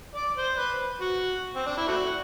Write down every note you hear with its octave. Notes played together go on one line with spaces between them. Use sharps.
D5
C5
B4
F#4
C4
D4
E4
A3 D4 F#4